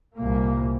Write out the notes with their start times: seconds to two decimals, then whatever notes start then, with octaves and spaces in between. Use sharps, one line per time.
0.16 C2 A#2 A#3